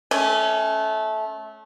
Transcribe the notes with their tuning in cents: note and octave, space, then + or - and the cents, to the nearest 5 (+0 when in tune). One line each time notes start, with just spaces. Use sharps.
A3 -20 C#4 +0